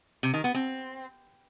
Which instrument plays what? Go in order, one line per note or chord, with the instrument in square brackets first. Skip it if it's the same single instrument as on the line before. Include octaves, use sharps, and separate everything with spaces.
[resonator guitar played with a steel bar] C3
D#3
B3
C4